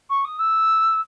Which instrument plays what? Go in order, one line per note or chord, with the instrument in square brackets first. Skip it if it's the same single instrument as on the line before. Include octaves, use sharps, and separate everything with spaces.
[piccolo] C#6
D#6
E6